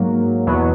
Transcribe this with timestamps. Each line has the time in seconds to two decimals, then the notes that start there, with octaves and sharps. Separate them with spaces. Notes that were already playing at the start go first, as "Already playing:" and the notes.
Already playing: G#2 F#3 A#3
0.46 E2 B2 F#3 B3